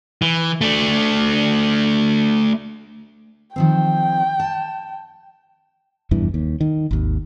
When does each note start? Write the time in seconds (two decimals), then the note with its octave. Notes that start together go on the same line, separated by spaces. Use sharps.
0.22 E3
0.61 A3 D4
3.56 D#3 F3 C4 G5
4.40 A5
6.11 F1 E2 G2 E3
6.34 D#2
6.61 D#3
6.91 G#1 D#2